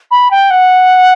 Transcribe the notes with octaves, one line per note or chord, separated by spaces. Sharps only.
B5
G5
F#5